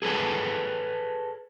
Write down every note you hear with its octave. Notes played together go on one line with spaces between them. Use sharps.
G#4 A4 B4 C#5 G#5